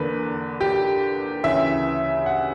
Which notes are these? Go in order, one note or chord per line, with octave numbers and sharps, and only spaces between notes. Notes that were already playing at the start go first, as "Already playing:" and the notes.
Already playing: E2 D3 A#3 B4
G4
D2 C#3 E3 E5
F#5